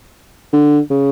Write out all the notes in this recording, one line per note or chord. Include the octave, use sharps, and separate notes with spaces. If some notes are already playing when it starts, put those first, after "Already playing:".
D3
C#3